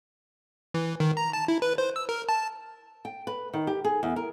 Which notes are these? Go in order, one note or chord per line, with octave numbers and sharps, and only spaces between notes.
E3
D#3
A#5
A5
E4
B4
C5
E6
A#4
A5
G5
B4
D#3
G4
G#4
E2
A#4